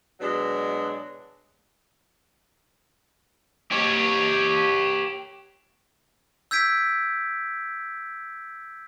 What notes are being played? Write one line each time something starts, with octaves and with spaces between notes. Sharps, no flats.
B2 F#3 G#3 D4
G4 C#5
E6 G6 G#6 B6 D7